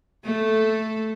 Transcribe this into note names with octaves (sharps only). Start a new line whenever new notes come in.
A3 A4